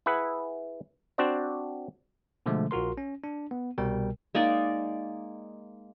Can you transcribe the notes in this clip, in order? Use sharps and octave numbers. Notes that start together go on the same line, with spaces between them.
E4 G#4 B4 E5 F#5
C4 D4 F#4 C5 D5
B2 D3 F3 G#3 A3
A#1 F4 F#4 A#4 C6
C#4
D4
B3
C2 B2 G3 A#4 G5
G#3 A#3 D#4 D5